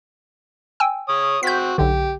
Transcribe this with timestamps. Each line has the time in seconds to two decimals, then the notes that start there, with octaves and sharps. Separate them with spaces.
0.80 G5 G#5 E6
1.09 C#5 D#6
1.43 C4 F#4 G6 B6
1.78 B1 D3 G4